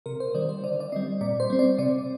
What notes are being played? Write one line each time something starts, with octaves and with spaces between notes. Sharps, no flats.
C3 A#4
C5
D#3 G3 D5
C5
D3 D5
D5
G3 C4 D#5
A#2 D5
C5
G3 C4
D5
C3 D5